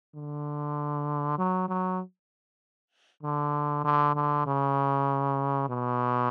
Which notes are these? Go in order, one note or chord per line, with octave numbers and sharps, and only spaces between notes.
D3
F#3
F#3
D3
D3
D3
C#3
B2